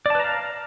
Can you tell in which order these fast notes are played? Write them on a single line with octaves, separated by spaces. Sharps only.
D5 A5 B4 A#5 F5